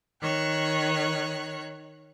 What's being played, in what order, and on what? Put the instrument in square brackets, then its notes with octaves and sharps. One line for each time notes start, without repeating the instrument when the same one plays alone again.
[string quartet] D#3 C#5 F#6